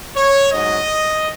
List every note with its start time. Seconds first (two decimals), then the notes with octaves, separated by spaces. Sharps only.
0.16 C#5
0.52 G#2 F#3 D#5